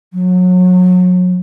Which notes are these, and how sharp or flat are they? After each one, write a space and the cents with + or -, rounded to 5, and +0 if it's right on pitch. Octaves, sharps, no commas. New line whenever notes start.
F#3 -30